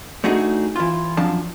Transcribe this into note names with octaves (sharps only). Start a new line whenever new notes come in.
A3 D4 D#4 F#4 G#4
E3 F4
F#2 F3 D4 A5